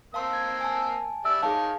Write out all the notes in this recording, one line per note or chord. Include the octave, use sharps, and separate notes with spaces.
A#3 C4 F5 A5 C6 E6
G#6
G#5 A5
G3 D5 E5 E6
D#3 G#4 C#5 F5 A5